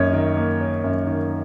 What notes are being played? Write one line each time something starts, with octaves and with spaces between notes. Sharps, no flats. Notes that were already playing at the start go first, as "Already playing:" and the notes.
Already playing: F#2 D#3 A#3 C#4 C#5 D#5
D#3
A#3
C#4
F#2
D#3